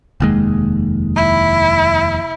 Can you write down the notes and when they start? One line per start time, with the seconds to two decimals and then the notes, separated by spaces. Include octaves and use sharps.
0.20 F1 D#2 G#3
1.16 E4